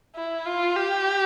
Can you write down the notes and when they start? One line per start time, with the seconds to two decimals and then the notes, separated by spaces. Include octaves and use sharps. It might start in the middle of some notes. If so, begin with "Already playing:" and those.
0.15 E4
0.46 F4
0.76 G4